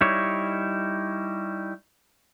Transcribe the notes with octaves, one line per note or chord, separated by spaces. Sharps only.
G3 D#4 E4 C#5